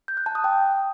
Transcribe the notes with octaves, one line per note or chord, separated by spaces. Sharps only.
G6
F#6
A5
D#6
G5